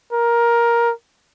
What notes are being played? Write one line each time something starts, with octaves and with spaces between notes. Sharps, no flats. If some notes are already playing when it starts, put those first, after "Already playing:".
A#4